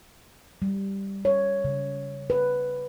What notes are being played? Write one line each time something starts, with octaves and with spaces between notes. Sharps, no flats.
G3
C#5
C#3
B4